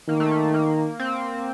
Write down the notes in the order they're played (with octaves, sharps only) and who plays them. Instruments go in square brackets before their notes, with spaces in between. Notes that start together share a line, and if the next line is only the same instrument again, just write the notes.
[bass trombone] D#3 [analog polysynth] A#3
[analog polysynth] A3
A#3
A#3
C4